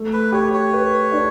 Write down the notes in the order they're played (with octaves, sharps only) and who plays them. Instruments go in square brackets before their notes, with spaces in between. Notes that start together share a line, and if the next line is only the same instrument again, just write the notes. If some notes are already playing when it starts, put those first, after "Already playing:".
Already playing: [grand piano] A3
[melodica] B4
[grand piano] G4 [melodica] C#5
[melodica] C#5
[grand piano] B4
D4